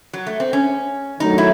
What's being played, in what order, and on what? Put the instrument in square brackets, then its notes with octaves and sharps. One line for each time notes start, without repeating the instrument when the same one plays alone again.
[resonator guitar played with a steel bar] F#3
A3
C4
C#4
[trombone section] D#3 F#3 A3 [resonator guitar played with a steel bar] D#4
[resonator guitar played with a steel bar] E4